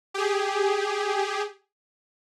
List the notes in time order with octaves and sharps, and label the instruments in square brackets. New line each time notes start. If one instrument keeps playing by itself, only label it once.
[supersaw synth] G4 G#4